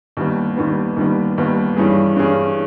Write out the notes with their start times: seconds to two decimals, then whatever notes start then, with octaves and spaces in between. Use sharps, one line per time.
0.17 D#2 D#3 G3 B3
0.57 D#2 D#3 G3 B3
0.96 D#2 D#3 G3 B3
1.38 D#2 D#3 G3 B3
1.76 G2 E3 G3 C#4 G#4
2.17 G2 E3 G3 C#4 G#4